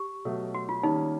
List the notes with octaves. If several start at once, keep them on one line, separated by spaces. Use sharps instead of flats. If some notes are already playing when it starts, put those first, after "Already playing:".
Already playing: G4
B2 F#3 A3
F#4
F4
D#3 G3 A#3 C#4 D#4